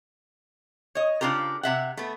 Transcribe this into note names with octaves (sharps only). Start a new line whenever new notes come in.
C#5 D#5
C#3 D4 F4 G4 A#4
C3 E5 F#5
A3 B3